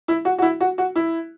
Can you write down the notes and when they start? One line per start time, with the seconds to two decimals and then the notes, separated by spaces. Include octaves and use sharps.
0.08 E4
0.25 F#4
0.38 F#4
0.42 E4
0.60 F#4
0.78 F#4
0.96 E4